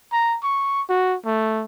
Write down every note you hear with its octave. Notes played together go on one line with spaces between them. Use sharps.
A#5
C#6
F#4
A3